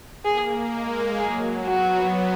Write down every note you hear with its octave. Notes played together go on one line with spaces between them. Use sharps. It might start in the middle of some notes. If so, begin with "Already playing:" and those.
A#3 G#4
G#3
F#3 G#4
B3 F#4